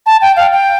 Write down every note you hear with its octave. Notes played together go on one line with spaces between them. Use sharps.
A5
G5
F5
G5